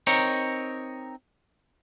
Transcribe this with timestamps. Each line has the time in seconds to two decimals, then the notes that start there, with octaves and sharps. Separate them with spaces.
0.07 C4 D#4 A#4 C#5